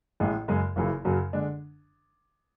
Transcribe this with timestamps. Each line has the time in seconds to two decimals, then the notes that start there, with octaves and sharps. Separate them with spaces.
0.20 A1 A2 G#3
0.48 F#2 C#3 G#3
0.76 F#1 F#2 C#3 E3
1.05 F#2 C#3 F#3
1.33 D3 G#3 D4